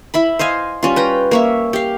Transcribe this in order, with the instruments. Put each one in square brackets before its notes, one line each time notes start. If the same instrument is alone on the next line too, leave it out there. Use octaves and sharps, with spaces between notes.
[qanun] E4 E5 B5
C5 D#5 F5 G#5
G3 C#4 F4
B4 G5 A#5
A#3 C#5 E5
G4 F5